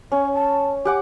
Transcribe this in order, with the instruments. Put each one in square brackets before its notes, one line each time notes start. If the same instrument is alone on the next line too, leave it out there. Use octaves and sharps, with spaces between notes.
[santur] C#4 [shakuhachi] C#5
[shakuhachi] A5
[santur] G4 F#5 D6 [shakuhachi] G#5